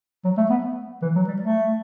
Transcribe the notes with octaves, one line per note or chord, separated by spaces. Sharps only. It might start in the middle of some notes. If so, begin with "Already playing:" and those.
F#3
A3
B3
E3
F#3
G3
A3